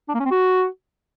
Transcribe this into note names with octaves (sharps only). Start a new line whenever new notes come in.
D4
A#3
C#4
C4
F#4